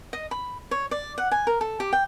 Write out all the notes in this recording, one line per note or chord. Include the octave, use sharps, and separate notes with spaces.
D#5
B5
C#5
D5
F#5
G#5
A#4
A4
G4
G5